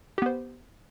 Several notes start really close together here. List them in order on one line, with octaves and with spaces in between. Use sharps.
G4 B3 C5